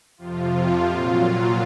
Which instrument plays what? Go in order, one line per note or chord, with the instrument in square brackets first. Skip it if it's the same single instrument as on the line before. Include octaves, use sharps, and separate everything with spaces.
[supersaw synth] F2 C3 F3 F4
A#2 F#3